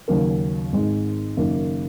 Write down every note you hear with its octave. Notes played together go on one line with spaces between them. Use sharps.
D#2 C#3 F#3 C#4 A#4
G#1 G#2 G#3
F#1 F#2 D#3 A#3